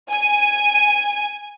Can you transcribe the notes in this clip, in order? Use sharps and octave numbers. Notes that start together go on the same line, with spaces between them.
G#5